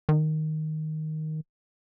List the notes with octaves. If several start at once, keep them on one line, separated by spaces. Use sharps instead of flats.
D#3